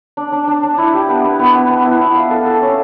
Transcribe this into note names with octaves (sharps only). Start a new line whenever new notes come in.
D4
D4
D4
D4
E4
G4
B3
B3
B3
B3
B3
E4
E4
F5
A4
A4
C#4